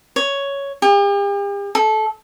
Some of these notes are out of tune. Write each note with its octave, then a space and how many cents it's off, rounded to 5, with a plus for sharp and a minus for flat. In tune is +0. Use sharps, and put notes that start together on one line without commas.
C#5 +5
G4 +45
A4 -20